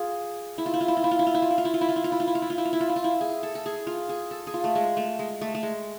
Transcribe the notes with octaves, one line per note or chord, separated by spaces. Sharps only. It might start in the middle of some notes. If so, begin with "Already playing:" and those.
Already playing: F4 G#4
E4
F4
E4
F4
E4
F4
E4
F4
E4
F4
E4
F4
E4
F4
E4
F4
E4
F4
E4
F4
E4
F4
E4
F4
E4
F4
E4
F4
E4
F4
E4
F4
E4
G#4
A4
A4
G#4
F4
G#4
A4
G#4
F4
A3
G#3
A3
G#3
A3
A3
G#3